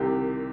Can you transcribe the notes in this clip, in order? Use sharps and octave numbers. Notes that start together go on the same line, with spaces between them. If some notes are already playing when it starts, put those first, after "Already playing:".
Already playing: C2 C3 D#3 G4